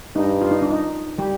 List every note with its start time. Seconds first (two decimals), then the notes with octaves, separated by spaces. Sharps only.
0.15 G2 D#4
0.41 F4
0.51 D#4
0.62 D4
0.71 D#4
1.18 G3 G4